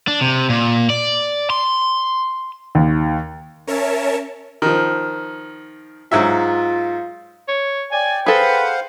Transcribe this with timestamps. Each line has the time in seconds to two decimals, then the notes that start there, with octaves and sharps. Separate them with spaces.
0.08 D4
0.21 C3
0.50 A#2
0.90 D5
1.50 C6
2.75 D#2
3.67 C#4 A#4 C#5 E5 A5
4.62 D#3 F3
6.12 G#2 F#3 F4 E5
7.48 C#5
7.92 D5 G5 G#5
8.26 G#4 A4 B4 C5 F5 F#5